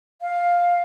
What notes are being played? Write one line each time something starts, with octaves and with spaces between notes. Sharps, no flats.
F5